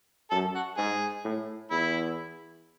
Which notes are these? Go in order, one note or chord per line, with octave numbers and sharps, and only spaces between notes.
F#2 A4
F#4
G#2 G#4
A2
E2 E4